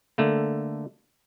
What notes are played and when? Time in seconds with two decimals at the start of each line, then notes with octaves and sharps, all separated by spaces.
0.18 D3 A3 A#3